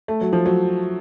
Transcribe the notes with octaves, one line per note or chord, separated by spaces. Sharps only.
A3
F#3
F3
F#3